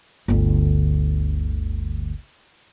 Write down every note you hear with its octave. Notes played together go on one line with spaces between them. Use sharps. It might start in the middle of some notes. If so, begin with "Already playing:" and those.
G1 D2